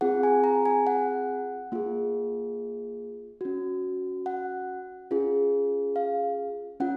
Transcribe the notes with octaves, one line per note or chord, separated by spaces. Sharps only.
C4 F4 G#4 F#5
G#5
A#5
G#5
F#5
A#3 F4 G#4
C#4 F#4
F#5
C#4 F4 G#4
F5
C#4 F4 F#5